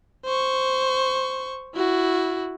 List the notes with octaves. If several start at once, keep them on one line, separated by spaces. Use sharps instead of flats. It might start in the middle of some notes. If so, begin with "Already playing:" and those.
C5 C#6
E4 F#4